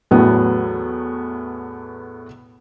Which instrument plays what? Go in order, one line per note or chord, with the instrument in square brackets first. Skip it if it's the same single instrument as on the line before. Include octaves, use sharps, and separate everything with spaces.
[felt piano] E2 A2 F#3 A3 B3